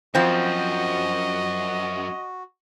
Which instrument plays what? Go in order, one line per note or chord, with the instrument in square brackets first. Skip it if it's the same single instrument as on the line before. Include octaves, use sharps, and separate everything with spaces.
[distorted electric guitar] F#2 [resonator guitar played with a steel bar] F3 C4 [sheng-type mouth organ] F#4 [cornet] D#5